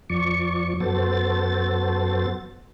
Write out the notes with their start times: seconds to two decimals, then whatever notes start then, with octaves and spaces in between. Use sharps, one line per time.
0.10 F2 F3 D5 C#6
0.80 F#2 B3 F#4 A4 C5 A6